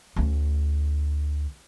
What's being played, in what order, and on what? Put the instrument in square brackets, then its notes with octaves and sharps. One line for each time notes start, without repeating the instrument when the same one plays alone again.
[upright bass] D2 C#4